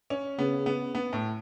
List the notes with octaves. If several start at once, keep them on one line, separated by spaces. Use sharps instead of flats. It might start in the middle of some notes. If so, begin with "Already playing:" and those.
C#4
C#3 B3
B3
B3
A2